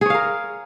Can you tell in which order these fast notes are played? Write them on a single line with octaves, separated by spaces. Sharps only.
G#4 C#5 F5 A#4